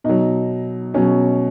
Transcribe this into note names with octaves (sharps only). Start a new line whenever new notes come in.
B2 F#3 D#4
B2 F#3 C#4